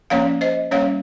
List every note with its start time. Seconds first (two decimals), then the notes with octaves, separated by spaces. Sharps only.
0.10 F3 A#3 C#4 C#5 F5
0.41 C5 D#5
0.71 G3 A#3 C#4 C#5 F5